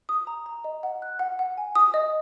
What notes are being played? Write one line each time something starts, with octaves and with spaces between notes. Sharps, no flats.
D#6
A#5
A#5
D#5
F#5
F#6
F#5
F#5
G#5
D#6
D#5